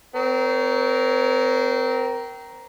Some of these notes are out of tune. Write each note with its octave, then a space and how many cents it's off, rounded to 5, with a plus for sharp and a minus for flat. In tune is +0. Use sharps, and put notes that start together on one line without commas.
C4 -25 A#4 +5 C#5 +20